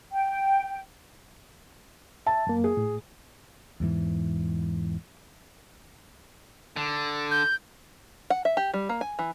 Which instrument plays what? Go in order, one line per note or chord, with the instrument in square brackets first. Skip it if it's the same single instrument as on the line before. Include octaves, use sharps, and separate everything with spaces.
[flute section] G5
[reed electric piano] E5 [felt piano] A5
[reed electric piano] F#2 A#3
[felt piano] G#4
[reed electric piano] A2
[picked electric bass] E2 G#2 E3
[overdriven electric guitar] D3
[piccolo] G6
[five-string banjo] F#5
E5
G4
G3
A#3
G#5
E3